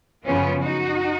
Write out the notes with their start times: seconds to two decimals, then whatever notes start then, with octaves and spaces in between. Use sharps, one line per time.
0.25 F#2 C#3 F3 B3 C#4 F4
0.61 D#4 F#4